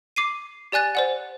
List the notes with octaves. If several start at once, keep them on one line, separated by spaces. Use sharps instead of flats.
D6 C7 D#7
G4 D5 G#5 F#6 A6
C5 D5 F#5